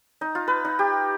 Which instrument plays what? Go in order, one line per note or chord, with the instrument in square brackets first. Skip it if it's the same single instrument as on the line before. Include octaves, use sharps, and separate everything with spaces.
[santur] D#4
F4
B4
D#4
G4